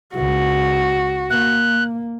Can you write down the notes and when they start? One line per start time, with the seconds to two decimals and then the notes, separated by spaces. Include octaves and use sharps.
0.15 C#2 F#4
1.30 A#3 F#6